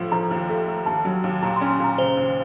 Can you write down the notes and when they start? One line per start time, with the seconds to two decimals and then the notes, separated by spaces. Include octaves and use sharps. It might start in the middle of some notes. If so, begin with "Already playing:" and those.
Already playing: A2 F3
0.12 F3 A#5
0.31 D#2
0.49 A3
0.68 A3
0.86 D#2 A5
1.05 F#3
1.24 D#2
1.42 A#2 A#5
1.56 C6
1.61 C#4
1.70 C6
1.79 A#2 A#5
1.98 C#3 C5
2.17 D#2